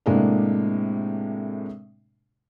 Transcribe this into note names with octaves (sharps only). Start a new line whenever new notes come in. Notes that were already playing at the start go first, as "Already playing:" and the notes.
A2 C3 G#3 A#3 D4